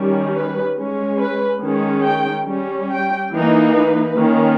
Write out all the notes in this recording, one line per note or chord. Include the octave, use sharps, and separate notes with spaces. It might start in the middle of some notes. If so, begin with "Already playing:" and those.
Already playing: D#3 G3 C#4
B4
G#3 C#4
B4
D#3 G#3 C#4
G5
G3 C#4
G5
E3 A#3 D#4
B4
D#3 A#3 C#4